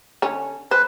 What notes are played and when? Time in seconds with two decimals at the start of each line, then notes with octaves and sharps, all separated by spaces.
0.22 D3 C#4
0.71 B4 C5